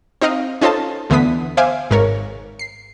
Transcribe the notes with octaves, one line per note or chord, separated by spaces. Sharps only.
C4 D#4 D#5 F5
C#4 D#4 F4 A4 C5 A5
D2 D3 E3 B3 D#6 B6
C5 E5 F5 G#5 D6
G#1 G#2 A#4 C#5
C7